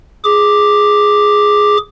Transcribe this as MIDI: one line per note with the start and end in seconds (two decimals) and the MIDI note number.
0.24 1.77 68
0.24 1.77 86